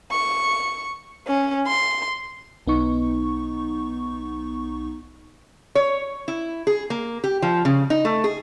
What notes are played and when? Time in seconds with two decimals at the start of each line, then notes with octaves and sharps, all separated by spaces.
0.12 C#6
1.27 C#4
1.67 C6
2.67 B1 B3 D#4 C#6
5.75 C#5
6.28 E4
6.67 G#4
6.90 A#3
7.24 G4
7.42 F3
7.65 C#3
7.90 D#4
8.05 A3
8.24 G#4